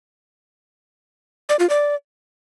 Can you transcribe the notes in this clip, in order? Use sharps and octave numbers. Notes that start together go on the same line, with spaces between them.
D5
F4
D5